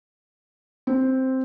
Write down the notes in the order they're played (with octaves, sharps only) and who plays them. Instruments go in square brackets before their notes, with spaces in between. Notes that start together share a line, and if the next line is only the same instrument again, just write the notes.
[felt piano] C4